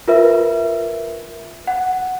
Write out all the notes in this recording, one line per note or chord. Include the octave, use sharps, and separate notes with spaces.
F4 A#4 B4 E5
F#5